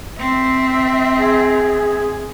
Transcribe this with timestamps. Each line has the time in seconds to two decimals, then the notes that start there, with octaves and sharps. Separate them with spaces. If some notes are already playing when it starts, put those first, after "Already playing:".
0.19 C4 E5
1.18 G#4